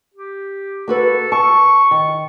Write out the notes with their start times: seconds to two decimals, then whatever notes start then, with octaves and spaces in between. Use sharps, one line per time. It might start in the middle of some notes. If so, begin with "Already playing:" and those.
0.14 G4
0.88 A#3 F#4 A4 B4
1.32 A5 C#6
1.91 D#3